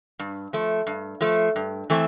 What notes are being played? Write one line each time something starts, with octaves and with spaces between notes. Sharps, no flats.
G2
F3 A3
G2
F3 A3
G2
E3 A3 C4